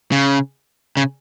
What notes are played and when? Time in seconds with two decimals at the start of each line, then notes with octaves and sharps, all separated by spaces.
0.12 C#3
0.97 C#3